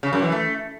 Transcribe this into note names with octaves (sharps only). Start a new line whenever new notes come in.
C#3
F#2
E3
A3